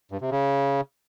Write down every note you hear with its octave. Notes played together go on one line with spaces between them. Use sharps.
G2
C3
C#3